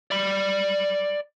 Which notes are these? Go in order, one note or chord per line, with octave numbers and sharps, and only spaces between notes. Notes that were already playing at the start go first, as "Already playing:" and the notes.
D5 B5